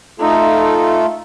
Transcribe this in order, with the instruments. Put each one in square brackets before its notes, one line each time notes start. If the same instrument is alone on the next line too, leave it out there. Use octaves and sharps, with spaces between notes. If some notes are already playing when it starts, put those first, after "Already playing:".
[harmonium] A3 F4 A4 [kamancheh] D#4